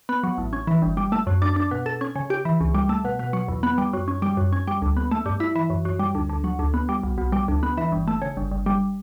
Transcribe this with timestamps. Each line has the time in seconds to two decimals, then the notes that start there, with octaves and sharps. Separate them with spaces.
0.09 B3
0.23 F#3
0.38 A1
0.53 C#4
0.67 E3
0.82 G1
0.97 G3
1.12 A3
1.27 F#2
1.42 D4
1.56 D4
1.71 B2
1.86 A4
2.01 C#4
2.15 C#3
2.30 G4
2.45 E3
2.60 C#2
2.74 G3
2.89 A3
3.05 B2
3.19 B2
3.33 F#3
3.48 E2
3.63 B3
3.78 G3
3.93 F#2
4.08 C#4
4.22 G3
4.37 F#2
4.52 C#4
4.67 G3
4.82 D2
4.97 B3
5.11 A3
5.26 G2
5.40 E4
5.56 E3
5.70 F#2
5.85 F#2
5.99 G3
6.15 D2
6.29 D2
6.44 F#3
6.59 D2
6.74 B3
6.89 G3
7.03 B1
7.18 B1
7.32 G3
7.48 D2
7.63 B3
7.77 E3
7.92 G1
8.08 A3
8.22 C#3
8.37 G1
8.51 G1
8.66 G3